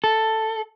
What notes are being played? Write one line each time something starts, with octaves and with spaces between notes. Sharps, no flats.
A4